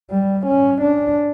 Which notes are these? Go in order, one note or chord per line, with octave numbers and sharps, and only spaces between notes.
G3
C#4
D4